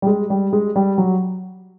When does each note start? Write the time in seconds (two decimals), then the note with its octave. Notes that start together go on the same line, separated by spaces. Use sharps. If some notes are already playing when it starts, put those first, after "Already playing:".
0.02 G3
0.07 G#3
0.30 G3
0.53 G#3
0.76 G3
0.98 F#3